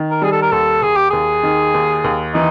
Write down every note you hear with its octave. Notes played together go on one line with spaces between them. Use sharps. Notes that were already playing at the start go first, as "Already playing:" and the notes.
Already playing: D#3
A#4
G3 G#4
A4
A#4
D#2 A4
D#2 G#4
G4
D#2 G#4
D#3
D#2
D#2
E3 D#4